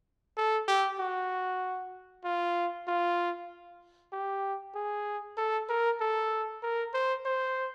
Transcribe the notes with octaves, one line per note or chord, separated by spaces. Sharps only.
A4
G4
F#4
F4
F4
G4
G#4
A4
A#4
A4
A#4
C5
C5